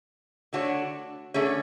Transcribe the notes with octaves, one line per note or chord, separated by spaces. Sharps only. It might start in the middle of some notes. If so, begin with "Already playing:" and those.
D3 A3 D4 F#4 C#5
D3 A3 C#4 G#4 C#5